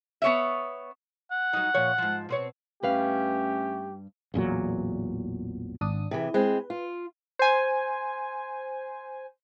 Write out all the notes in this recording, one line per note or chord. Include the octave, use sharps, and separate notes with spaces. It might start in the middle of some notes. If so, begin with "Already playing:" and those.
B3 C#5 E5
F#5
F#3 D#4
A#2 F3 C#5
G#2 F3
B2 C4 C#5
G2 A3 C#4 G4 B4 F5
A1 E2 A#2 F#3
G#1 D4 D#6
C3 E3 G#4
G#3 C4 B4
F4
C5 G#5